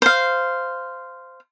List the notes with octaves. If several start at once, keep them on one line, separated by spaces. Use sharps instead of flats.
C5 F5